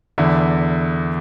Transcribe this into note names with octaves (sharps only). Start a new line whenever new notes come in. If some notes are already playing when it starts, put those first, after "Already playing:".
E2 D3 E4